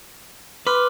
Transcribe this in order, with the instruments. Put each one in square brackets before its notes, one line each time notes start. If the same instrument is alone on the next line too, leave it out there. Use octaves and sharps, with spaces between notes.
[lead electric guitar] B4 [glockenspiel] C6 D6 F6